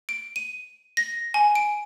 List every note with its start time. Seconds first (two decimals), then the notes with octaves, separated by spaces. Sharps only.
0.09 D7
0.36 D#7
0.97 A#6
1.34 G#5
1.55 D7